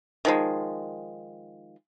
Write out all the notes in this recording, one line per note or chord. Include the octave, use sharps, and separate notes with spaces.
D#3 F3 G#3